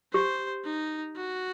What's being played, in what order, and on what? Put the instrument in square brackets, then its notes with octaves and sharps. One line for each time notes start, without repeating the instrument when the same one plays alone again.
[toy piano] G4 [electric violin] C5
[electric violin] D#4
F#4